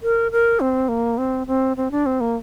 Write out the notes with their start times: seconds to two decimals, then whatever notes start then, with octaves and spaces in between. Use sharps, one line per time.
0.02 A#4
0.32 A#4
0.60 C4
0.89 A#3
1.18 C4
1.47 C4
1.77 C4
1.91 D4
2.06 C4
2.21 A#3